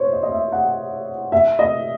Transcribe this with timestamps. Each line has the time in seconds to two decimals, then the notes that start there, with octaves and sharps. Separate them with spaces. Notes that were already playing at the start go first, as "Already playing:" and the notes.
Already playing: C5 C#5
0.13 D#5
0.23 D#5
0.32 E5
0.52 F#5
1.32 E5
1.59 D#5